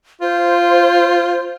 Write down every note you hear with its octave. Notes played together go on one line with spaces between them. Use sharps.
F4 C5